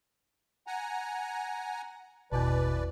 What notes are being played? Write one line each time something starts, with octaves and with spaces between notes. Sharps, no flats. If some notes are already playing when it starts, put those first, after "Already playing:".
F#5 G#5 A#5
G#1 E2 B2 E3 B4 D5 A5